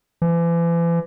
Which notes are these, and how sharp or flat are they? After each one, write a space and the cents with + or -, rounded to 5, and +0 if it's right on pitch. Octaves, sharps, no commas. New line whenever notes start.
E3 +40